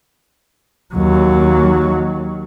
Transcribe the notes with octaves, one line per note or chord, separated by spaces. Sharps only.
D#2 F#3